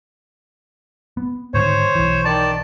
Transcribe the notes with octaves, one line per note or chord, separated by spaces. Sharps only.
B3
G#2 D3 D#3 C5 C#5
B1 E3
D#3 D5 A5